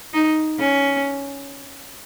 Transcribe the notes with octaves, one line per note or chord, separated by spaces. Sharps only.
D#4
C#4